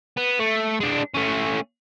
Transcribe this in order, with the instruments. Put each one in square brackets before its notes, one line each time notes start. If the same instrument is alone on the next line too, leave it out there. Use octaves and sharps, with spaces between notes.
[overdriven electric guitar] B3
A3
G#3 D4
A3 C#4